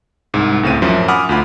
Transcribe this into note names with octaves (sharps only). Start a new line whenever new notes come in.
C2 G#2
C#2 A2 C4 D#7
A1 F#2 F3 E5
F#5 G#5 B5 D6 D#6 F6
D2 F4 B5